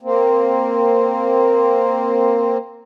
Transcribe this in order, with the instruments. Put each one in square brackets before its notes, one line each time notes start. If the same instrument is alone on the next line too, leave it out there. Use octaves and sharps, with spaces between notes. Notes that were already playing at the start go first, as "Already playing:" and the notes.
[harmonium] A#3 C4